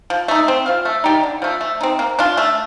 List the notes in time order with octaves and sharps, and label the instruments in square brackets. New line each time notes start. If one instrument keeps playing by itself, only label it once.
[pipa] F3
A3 D#4
C4
F4 C5 F5
A3
D#4 G4 D5
D3
F3 A3
A3
C4 D#4
A#3
D4 F4
A3